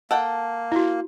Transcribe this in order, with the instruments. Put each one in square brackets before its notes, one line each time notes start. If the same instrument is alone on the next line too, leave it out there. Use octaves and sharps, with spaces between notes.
[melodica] A#3 [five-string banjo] A4 F#5 G5
[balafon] E4 F#4